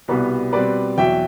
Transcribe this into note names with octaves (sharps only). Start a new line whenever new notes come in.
C2 B2 G3 B3 B4
B2 G3 C4 B4 D5
E2 B2 F#3 E5 G5